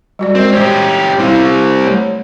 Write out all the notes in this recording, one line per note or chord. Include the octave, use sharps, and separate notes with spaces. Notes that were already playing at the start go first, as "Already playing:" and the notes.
G3 F#4 D5
G#3 C4 A#4
C#4 G4 C5
G3 C4 E4 F5
A3 C#5